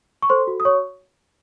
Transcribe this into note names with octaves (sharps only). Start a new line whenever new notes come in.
C#6
A4 C5 C6
F#4
D#6
C#5 C#6